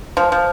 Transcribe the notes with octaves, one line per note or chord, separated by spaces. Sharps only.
F3
F3